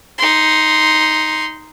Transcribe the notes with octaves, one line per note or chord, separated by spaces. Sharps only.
D#4 C6